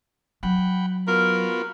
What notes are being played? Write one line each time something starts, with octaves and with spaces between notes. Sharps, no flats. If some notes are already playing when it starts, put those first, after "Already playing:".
F#3 F#5 G5 B5
B3 F4 F#4 A#4